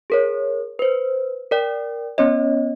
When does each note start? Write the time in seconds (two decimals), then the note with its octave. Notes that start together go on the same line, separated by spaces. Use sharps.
0.10 G#4 A#4 C#5
0.79 B4 C5
1.51 A#4 D5 G5
2.18 B3 C#4 C#5 D#5